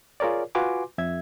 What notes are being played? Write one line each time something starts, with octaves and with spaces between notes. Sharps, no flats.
F4 G#4 A#4 C#5 D5
F4 F#4 B4 G#5 C6 D6
F2 E5 G#6